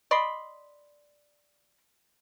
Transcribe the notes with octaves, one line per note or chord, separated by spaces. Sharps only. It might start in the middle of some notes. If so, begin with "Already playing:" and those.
D5 D#5 B5 C6